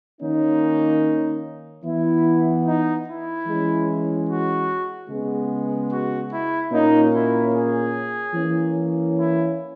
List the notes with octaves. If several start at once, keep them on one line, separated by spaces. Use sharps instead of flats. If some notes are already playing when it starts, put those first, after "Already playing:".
D#3 A#3 C#4 D#4
E3 B3 E4
D#4
E4
E3 G#3 C#4
F#4
C#3 G#3 B3
F#4
E4
A#2 A#3 C#4 D#4
E4
G#4
E3 A#3 C#4
E4